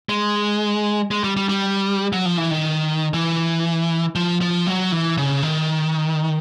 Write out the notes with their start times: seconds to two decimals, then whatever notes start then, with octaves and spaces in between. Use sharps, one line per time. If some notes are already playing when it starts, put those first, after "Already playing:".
0.09 G#3
1.11 G#3
1.24 G3
1.37 G3
1.49 G3
2.13 F#3
2.25 F3
2.38 E3
2.51 D#3
3.14 E3
4.15 F3
4.41 F3
4.67 F#3
4.92 E3
5.18 C#3
5.43 D#3